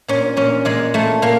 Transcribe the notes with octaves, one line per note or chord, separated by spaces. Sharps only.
A#2 C#4
A#2 C#4
A#2 G#3
A#2 A3
A#2 A#3